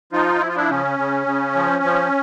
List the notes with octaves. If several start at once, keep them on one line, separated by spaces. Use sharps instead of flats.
F3 D#4 F4
F3 E4
F4
D4 E4
C#3 C#4
C#3
C#3
F3
F3